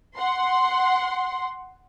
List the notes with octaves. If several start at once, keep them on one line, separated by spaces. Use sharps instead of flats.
F#5 C6